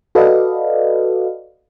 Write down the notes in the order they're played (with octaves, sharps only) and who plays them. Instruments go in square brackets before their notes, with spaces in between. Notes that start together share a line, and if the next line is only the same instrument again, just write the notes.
[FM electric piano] F#4 A4 B4 D5 D#5 F5